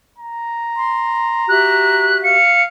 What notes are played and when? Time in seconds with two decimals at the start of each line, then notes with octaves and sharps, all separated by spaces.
0.18 A#5
0.76 C6
1.48 F#4 G4 E5 F#6
2.23 F5 C#7